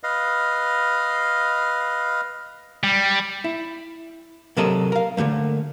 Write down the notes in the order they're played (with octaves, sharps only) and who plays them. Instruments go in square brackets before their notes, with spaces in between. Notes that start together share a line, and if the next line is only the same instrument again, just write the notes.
[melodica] B4 D#5 F5
[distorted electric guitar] G3
[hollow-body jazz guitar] E4
C3 F#3 A4 A#4 C5 D#5
A#4 F5
D3 F3 A3 A#3